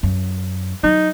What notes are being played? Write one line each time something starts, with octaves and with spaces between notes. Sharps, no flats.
F#2
F#3 D#4